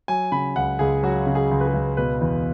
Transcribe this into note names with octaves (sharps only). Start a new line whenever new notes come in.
F#3 G#5
C#3 B5
C#2 F#5
C#2 G#4
F#3 F#4
C#3
G#4
C#2
B4
G#4
C#2
B2 B4
E2